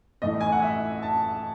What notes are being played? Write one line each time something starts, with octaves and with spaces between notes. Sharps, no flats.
A1 A2 E3 A3 D#5
G#5
F#5
E5
A5